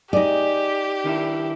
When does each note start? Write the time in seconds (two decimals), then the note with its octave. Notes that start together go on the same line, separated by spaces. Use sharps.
0.13 D#4 G4 G#4 D5
1.04 D#3 D4 E4